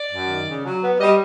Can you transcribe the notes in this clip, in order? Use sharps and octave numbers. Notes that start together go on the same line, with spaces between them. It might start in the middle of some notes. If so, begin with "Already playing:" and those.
Already playing: D5
F#2
D#3
C#3
F#3
B3
G3 D#5